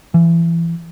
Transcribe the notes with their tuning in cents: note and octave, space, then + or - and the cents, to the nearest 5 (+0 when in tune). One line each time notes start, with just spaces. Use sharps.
E3 +25